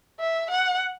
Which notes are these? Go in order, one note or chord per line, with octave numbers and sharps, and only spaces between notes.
E5
F#5